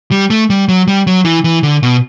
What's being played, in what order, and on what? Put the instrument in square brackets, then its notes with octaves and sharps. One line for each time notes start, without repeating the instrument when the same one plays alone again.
[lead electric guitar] G3
A3
G3
F#3
G3
F#3
E3
E3
D3
B2